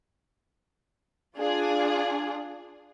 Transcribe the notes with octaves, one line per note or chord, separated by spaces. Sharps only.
D4 F4 G#4